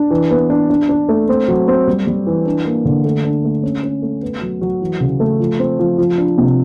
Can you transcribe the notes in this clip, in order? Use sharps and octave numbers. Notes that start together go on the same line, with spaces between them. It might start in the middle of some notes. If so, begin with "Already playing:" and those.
Already playing: D4
E3
B3
D4
D4
D4
A3
C4
F#3
C4
G3
G3
E3
D4
A#3
D3
A3
D4
A3
C#4
C#4
A3
B3
F#3
F#3
E3
C#3
A3
F3
C4
F3
F3
D4
C3